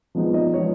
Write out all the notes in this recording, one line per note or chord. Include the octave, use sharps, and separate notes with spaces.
F3 G#3 B3 D#4
D#5
F3 B3 D#4 C#5